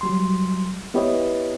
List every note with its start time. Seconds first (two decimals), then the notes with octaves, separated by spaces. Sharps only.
0.01 F#3 G3 C6
0.94 B3 E4 G4 B4 C#5 D#5